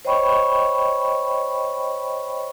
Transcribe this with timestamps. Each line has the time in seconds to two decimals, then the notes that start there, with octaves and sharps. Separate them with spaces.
0.05 C5 C#5 D#5 G5 B5 C#6